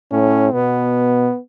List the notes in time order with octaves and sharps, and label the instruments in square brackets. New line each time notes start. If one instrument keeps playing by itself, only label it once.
[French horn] A2 [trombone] C#4
[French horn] B2 [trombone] B3